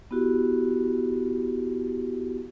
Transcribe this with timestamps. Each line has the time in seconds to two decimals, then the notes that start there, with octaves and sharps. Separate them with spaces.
0.11 B3 E4 F#4 G4